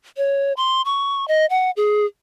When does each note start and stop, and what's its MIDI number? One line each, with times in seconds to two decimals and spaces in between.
0.17 0.53 73
0.57 0.82 84
0.85 1.27 85
1.28 1.46 75
1.50 1.71 78
1.77 2.05 68